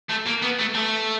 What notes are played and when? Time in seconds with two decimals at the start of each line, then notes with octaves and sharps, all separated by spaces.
0.09 A3
0.26 A#3
0.42 B3
0.59 A3
0.75 A3